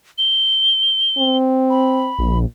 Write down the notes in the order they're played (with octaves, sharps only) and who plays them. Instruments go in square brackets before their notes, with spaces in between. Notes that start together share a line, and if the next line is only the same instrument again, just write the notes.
[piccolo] G7
[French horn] C4
[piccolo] B5
[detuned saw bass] A#1